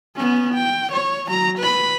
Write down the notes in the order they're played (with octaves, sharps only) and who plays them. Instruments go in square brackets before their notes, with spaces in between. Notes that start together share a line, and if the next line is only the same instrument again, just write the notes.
[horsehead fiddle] B3 C#4
G5
C#5
F#3 A#5
B4 B5